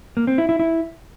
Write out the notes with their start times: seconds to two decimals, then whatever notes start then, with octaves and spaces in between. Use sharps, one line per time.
0.17 A#3
0.27 C4
0.38 E4
0.49 E4
0.60 E4